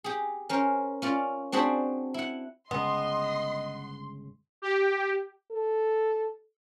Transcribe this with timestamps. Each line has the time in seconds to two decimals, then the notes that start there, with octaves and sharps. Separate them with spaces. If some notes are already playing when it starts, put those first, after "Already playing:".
0.04 G4 G#4
0.49 C#4 A#4 C5
1.02 C#4 F4 D5
1.52 C4 D4 F#4 G#4 C5 B5
2.14 E4 F#5
2.71 G1 C#3 G#3 B3 D#5 C6
4.62 G4
5.51 A4